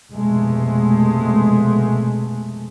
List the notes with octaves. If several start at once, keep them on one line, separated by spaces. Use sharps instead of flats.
F1 B2 G#3 A3